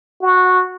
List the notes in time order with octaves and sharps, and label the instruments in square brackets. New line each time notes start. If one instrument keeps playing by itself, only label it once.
[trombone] F#4